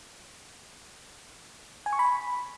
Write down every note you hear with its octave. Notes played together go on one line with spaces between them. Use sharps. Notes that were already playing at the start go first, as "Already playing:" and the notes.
G#5
C#6
B5